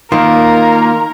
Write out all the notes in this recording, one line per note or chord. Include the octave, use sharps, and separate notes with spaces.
D#3 A#3 F4 A#4